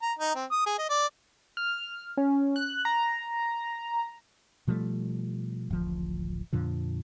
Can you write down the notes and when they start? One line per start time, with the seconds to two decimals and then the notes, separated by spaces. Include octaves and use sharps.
0.02 A#5
0.19 D#4
0.35 C4
0.51 D#6
0.66 G#4
0.78 D#5
0.90 D5
1.57 F6
2.17 C#4
2.56 F#6
2.85 A#5
4.67 B2 F3 G3 A3
5.71 D1 A1 F3
6.53 F2 A#2 D3 F3